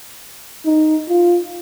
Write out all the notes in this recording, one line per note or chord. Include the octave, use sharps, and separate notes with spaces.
D#4
F4